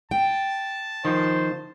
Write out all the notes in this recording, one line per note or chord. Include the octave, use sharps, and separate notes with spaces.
G5 A5
D#3 F3 C5